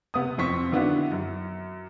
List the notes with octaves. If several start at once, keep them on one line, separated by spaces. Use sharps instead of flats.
C3 B3 D#6
F2 C4 C#6 B6
D3 D#3 B3 D4 E4 F#4
F#2